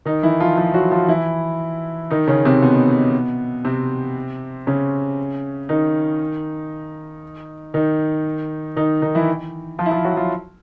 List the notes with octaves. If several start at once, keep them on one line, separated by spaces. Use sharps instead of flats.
D#3 D#4
E3 E4
F3 F4
F3 F4
F#3 F#4
F3 F4
E3 E4
D#3 D#4
C#3 C#4
C3 C4
B2 B3
C3 C4
C#3 C#4
D#3 D#4
D#3 D#4
D#3 D#4
D#3 D#4
E3 E4
F3 F4
E4
F3 F4
F#3 F#4
F3 F4